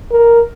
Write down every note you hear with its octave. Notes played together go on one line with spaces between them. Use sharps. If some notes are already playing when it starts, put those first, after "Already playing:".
A#4